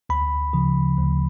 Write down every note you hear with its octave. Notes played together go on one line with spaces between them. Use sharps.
D2 B5
C#3 F3
D2